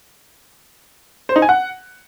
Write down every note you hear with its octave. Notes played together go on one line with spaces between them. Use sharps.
C5
D#4
G#5
F#5